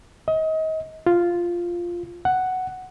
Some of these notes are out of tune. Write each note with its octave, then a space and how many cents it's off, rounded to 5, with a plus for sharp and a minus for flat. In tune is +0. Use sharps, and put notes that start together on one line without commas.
D#5 +30
F4 -5
F#5 +5